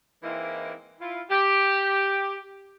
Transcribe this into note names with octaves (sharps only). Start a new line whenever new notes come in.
E3 G#3 A#3 C4 D#4 E4
E4 F4
G4